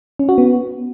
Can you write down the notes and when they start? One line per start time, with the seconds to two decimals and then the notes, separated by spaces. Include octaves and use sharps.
0.19 C#4
0.29 F#4
0.38 B3